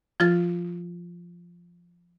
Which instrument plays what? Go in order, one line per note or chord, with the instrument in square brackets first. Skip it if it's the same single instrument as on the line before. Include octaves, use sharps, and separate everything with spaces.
[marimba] F3 F4 A6